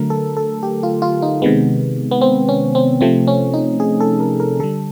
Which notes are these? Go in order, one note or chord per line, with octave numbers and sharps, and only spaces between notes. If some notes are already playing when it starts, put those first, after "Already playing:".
Already playing: D3 F#3 A3 A#4
A4
A4
G4
F4
F4
D#4
C3 D#3 G#3 B3
B3
C4
C#4
C4
C3 F3 A3 C4
C#4
D#4
G#4
A4
A#4
A#4
D3 G3 A4